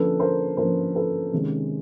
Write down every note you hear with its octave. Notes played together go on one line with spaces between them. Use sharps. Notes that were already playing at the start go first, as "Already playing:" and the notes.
Already playing: D3 F3 A#3 C#4 A4 B4
A#4 C5
D3 F3 A#3 C#4 A#4 C5
A4 B4
C3 D#3 G#3 C#4